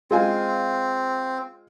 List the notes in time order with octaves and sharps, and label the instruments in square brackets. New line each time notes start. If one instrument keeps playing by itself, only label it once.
[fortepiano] G#3 F4 G#5 [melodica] C4